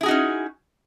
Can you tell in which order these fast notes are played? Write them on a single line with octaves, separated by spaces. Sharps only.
E4 G#4 F#4 D#4 C#4